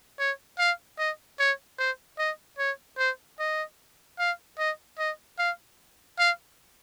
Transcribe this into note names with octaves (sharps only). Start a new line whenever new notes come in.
C#5
F5
D#5
C#5
C5
D#5
C#5
C5
D#5
F5
D#5
D#5
F5
F5